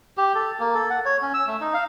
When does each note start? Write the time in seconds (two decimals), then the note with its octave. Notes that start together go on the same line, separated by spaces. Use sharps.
0.18 G4
0.35 A4
0.60 A#3
0.74 A4
0.90 F#5
1.05 C#5
1.22 C#4
1.34 E6
1.47 A3
1.61 D#4
1.74 F5